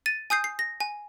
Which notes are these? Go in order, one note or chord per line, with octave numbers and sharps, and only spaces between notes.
A6 D#7
G#5 D#6 G6 C7
C7
A#6
G#5